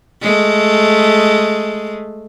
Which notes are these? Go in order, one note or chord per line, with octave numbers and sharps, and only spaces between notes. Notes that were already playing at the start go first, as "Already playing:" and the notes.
G#3 A3